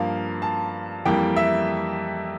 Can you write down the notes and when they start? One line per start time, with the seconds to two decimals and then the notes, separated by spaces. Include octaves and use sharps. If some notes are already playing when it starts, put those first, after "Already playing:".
Already playing: G2 F3 A#3 F5
0.42 A5
1.05 F2 E3 G3 A#3 G5
1.36 E5